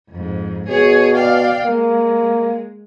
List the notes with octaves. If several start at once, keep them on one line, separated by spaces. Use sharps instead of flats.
F2 G#2
B2 G#4 C#5
D5 F5 G5
G#3 A#3